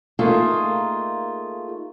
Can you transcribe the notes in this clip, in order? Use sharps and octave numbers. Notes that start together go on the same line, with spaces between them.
A3 A#3 D#4 F4 G#4 A4